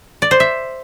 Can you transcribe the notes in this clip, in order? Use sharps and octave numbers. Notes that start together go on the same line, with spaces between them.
D5
C5
E5